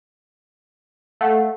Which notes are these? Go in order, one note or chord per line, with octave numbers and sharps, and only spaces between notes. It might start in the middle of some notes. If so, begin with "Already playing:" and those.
A3 F5 F#5